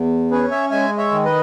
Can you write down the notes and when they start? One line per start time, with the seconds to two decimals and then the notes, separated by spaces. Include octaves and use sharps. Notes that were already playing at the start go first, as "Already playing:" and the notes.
Already playing: E2
0.31 C#4 G#4 B4
0.51 C#5 E5
0.71 G#3 E5 G#5
0.98 C#5 E5
1.11 D#3
1.25 B4 D#5